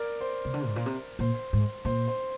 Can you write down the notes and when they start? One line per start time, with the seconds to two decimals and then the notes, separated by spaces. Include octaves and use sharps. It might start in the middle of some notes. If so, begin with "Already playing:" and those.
Already playing: A#4 D5
0.21 C5
0.45 C3
0.54 D3
0.67 G#2
0.76 A#2
0.86 C3
1.19 A#2 C5
1.53 G#2
1.85 A#2 C5
2.08 C5